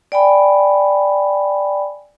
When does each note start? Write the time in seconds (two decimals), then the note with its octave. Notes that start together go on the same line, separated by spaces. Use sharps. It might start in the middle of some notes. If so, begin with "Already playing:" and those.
0.12 D5 G5 G#5 B5